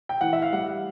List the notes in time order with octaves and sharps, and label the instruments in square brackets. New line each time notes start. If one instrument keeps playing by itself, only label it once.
[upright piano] G5
E3 F#5
E5
F5
G3 F#5